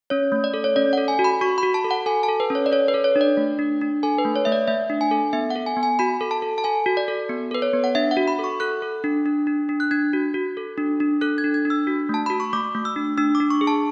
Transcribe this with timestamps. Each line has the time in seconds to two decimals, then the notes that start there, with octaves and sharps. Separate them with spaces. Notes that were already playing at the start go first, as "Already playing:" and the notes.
0.10 C#4 C#5
0.32 A3
0.44 D5
0.54 A4
0.64 C#5
0.76 C#4 D5
0.93 F#5
0.98 A4
1.08 G#5
1.19 F#4
1.24 B5
1.41 F#4 C#6
1.58 B5
1.63 F#4
1.74 A5
1.85 A4
1.91 F#5
2.06 A4 G#5
2.23 A5
2.28 A4
2.40 B4
2.50 C#4 C#5
2.66 D5
2.72 A4 C#5
2.88 B4
2.94 A4
3.04 C#5
3.16 D4
3.21 D5
3.37 A3
3.59 D4
3.81 D4
4.03 A4 G#5
4.19 B4
4.25 A3
4.36 C#5
4.45 A3 E5
4.52 D5
4.68 A3 E5
4.90 D4
5.01 G#5
5.11 A4
5.33 B3 E5
5.50 F#5
5.56 A4
5.66 G#5
5.77 B3
5.83 G#5
5.99 F#4 B5
6.21 A4
6.31 A5
6.42 A4
6.58 A5
6.64 A4 G#5
6.86 F#4
6.97 D5
7.08 A4
7.29 B3
7.51 A4 B4
7.62 C#5
7.74 B3
7.84 F#5
7.95 D4 E5
8.11 F#5
8.17 F#4
8.28 B5
8.39 A4
8.44 C#6
8.60 A4 F#6
8.82 A4
9.04 D4
9.26 D4
9.47 D4
9.69 D4
9.80 F#6
9.91 D4 G#6
10.13 F#4
10.34 F#4
10.57 A4
10.78 D4
11.00 D4
11.21 A4 F#6
11.38 G#6
11.44 D4
11.54 G#6
11.65 D4
11.70 E6
11.87 F#4
12.09 A3 A5
12.26 F#4 B5
12.40 C#6
12.53 A3 D6
12.75 A3
12.85 E6
12.96 D4
13.17 D4 E6
13.35 D6
13.40 D4
13.50 C#6
13.61 G#4
13.67 A5